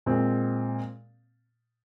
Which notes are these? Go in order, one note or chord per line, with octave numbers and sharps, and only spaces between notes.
A#2 G#3 C4